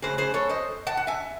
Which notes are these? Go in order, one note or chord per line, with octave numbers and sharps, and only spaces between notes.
C#3 F#3 A3 G#4 C5
G#4 C5
A4 C#5
C5 D#5
F#5 A5
F#5
E5 G#5